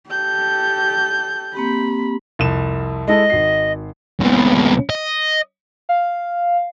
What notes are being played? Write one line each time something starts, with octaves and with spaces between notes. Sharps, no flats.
G4 A4 G6
A#3 C4 G4 B5
C2 F2 E7
G#3 E4 A4 D#5
G#1 F#4 C7
C#2 B2
D#5
F5